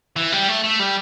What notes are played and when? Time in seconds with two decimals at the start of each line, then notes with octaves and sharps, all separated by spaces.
0.16 E3
0.32 G3
0.48 A3
0.64 A3
0.79 G3